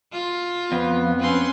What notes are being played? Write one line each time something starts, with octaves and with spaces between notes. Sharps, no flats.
F4
F2 B3
C4 C#4 B4 C6